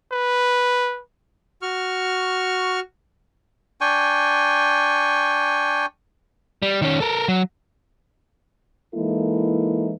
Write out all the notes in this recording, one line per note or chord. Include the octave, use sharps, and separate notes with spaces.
B4
F#4 C#6 F6
D4 G5 G#5 C#6
G3
D#3 C#4
A4 A#4
F#3
E3 G#3 A#3 D#4 E4 A4